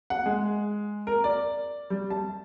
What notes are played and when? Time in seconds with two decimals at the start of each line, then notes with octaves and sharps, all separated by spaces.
0.10 F#5
0.26 G#3
1.07 A#4
1.24 D5
1.90 G3
2.11 A5